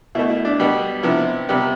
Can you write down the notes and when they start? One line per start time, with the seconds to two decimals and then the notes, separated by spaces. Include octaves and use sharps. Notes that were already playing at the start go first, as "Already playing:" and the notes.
0.15 B2 E4
0.19 A3
0.30 E4
0.45 D4
0.60 B2 G3 B3
1.03 C3 F3 B3 E4
1.49 C3 G3 B3